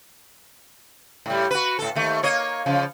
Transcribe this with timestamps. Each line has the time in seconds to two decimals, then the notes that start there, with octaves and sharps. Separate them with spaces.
1.26 A2 G3
1.51 F#4 B4
1.79 A2 A4
1.95 D#2 A3
2.23 A#3 C#5 D#5
2.66 C#3 F3